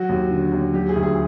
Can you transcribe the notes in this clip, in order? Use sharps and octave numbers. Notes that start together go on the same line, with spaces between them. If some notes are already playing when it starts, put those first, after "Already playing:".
Already playing: F#3 F#4
D#2
D3
D#2
F#3 G4
G#4
D2
G#4